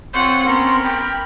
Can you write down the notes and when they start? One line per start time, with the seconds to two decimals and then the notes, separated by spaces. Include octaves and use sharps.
0.14 C4 F4 C#5 F#5 C6
0.47 B3 C#4 A#4
0.83 G5 B5